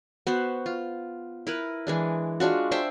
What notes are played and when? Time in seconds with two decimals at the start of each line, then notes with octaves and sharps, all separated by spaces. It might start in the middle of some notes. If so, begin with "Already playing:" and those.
0.27 B3 F#4 C5
0.66 F4
1.47 E4 A#4 B4
1.87 E3 G#3 D4
2.40 G#3 D4 F4 F#4
2.71 D4 C5 E5 G5